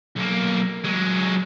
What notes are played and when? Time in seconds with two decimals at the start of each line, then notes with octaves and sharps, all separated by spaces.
0.16 B1 A#3
0.85 F#3 G#3